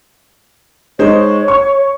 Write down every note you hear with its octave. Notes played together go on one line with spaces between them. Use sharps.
G#3 D#4 C5 C#5
C#6